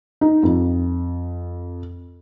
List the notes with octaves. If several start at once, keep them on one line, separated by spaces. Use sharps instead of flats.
D#4
F2